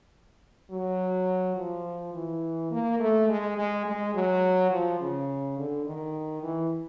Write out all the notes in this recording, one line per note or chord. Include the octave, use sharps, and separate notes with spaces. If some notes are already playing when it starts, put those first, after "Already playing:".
F#3
F3
E3
A#3
A3
G#3
G#3
G#3
F#3
F3
C#3
D3
D#3
E3